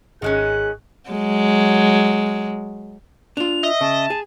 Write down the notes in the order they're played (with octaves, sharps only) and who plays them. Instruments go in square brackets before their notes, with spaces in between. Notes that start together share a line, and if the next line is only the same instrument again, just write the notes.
[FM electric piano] G#1 [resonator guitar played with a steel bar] D#3 G#3 C#4 [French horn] G#4 [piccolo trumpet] F#6
[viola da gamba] F#3 G#3
[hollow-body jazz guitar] D4 F4 [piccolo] F7
[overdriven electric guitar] D#5 [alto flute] E5
[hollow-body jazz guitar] C#3 [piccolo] A5
[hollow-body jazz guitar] G#4